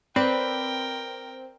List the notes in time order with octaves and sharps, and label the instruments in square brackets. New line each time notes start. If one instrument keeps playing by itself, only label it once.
[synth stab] C4 [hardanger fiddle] A#4 G5 [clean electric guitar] B4 [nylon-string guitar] D5